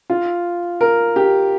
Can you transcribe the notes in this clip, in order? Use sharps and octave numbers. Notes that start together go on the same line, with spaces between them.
F4
A#4
G4